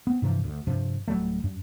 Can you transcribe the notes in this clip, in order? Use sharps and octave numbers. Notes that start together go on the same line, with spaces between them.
B3 C4
G2 C3 E3 F3
D2
G2 C3 F3
D1 F#3 G3 A3
F#2